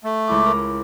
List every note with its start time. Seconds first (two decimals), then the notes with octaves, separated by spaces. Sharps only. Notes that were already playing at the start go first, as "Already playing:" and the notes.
0.04 A3
0.27 C#2 E4 D6
0.46 A#4